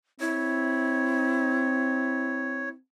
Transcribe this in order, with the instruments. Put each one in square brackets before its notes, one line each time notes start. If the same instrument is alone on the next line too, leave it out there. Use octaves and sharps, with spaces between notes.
[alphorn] C4 [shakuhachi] E4 [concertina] C#5